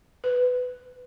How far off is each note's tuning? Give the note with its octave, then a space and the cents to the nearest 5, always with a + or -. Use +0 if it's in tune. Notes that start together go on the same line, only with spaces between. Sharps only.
B4 +15